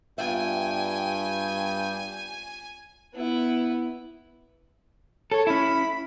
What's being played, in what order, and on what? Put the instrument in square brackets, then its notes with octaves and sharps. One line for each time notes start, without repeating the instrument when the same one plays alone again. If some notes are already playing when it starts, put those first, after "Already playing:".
[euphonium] G2 [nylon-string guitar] B3 F4 E5 [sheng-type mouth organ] G5 [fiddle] G#5
[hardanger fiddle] B3 E4
[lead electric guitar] A4 [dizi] C#5
[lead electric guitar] C#4 E4 [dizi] B5